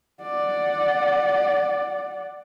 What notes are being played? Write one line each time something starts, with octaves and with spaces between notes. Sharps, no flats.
D5 F#5